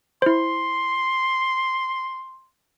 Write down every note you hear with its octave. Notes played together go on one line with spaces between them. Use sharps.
E4 C5 C6